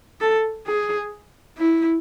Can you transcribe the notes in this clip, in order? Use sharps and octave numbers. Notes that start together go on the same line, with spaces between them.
A4
G#4
E4